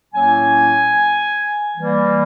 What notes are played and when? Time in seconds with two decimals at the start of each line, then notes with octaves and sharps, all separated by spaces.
0.13 A2 F#3 A#3 C#4 G#5
1.75 E3 G3 A#3